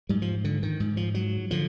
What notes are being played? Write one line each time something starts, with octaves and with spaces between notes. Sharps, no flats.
G#2 G3
F3
D3
D#3
G#2
F3
F#3
D3 F3